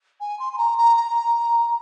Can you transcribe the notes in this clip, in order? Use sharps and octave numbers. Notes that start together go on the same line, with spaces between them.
G#5
C6
C6
A#5
A#5
A#5